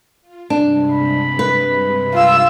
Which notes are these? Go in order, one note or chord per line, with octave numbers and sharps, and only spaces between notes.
F4
G2 C3 G#3 D4
B5
B4
F4 E6